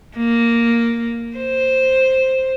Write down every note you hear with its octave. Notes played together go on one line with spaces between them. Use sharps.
A#3
C5